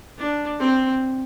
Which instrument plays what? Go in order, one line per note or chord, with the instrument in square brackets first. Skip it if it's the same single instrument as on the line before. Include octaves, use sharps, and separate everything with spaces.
[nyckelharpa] D4
C4